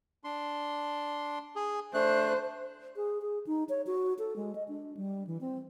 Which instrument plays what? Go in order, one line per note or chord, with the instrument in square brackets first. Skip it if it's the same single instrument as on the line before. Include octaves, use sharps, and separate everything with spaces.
[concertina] D4 C6
G#4
[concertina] A3 D4 F#6 [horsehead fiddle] C5
[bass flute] G#4
G#4
D#4
C#5
F#4
A4
G#3
D#5
D4
G3
E3
C4